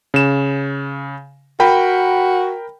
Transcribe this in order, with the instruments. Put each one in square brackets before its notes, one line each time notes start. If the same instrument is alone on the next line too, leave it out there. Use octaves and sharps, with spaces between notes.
[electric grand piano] C#3 E7
[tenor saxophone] F#4 [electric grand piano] A#4 G5 B5